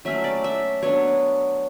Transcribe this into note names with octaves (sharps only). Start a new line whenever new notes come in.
F#3 A3 C#4 E5
D5
E5
F#3 B3 D4 C#5